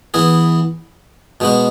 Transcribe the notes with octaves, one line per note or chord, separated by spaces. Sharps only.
E3 B3 E4 G#4
B2 G#3 B3 F#4